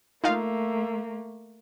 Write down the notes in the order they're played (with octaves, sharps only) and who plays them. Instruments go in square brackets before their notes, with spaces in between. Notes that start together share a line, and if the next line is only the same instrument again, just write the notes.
[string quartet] A3 A#3 [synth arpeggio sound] D#4 F4 F5